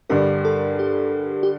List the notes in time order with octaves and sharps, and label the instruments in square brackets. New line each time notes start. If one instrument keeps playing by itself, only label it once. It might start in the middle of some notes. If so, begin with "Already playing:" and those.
[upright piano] G2 D3 G3 D4 [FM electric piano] A#4
[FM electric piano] A4
G4
G4